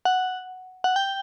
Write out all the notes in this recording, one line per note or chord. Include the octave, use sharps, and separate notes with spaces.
F#5
F#5
G5